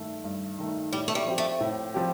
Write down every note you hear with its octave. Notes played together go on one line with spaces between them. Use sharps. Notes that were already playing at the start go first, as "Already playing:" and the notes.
Already playing: G2 D#3 A3
G2
D#3 A3
A2 G3
A3
G3
F3 C4 G4
A3
A2
F3 C4 G4